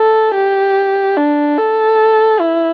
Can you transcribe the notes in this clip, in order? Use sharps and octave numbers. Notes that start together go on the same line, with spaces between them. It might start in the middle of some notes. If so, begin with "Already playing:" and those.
Already playing: A4
G4
D4
A4
E4